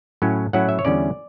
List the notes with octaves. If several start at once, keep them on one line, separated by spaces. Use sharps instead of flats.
A2 F#3 C#4 E4
A2 F#3 C#4 E4 F#5
E5
C#5
E2 D3 G3 C#4 E4 D5